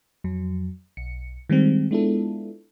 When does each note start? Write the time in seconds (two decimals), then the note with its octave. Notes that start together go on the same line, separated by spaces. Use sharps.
0.24 F2 F#3
0.97 B1 C#7
1.50 D#3 G3 G#3 C4
1.91 G#3 B3 D4 E4 F4 A4